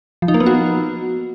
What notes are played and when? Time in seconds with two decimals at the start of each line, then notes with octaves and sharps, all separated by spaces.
0.22 F3
0.28 D#4
0.34 A#3
0.40 B3
0.46 F#4